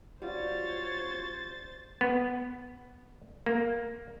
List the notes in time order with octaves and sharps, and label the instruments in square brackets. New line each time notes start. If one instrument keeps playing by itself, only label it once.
[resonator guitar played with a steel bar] G3 [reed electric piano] F4 F#4 [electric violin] C5 A6 [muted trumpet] C#5
[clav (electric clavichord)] B3
A#3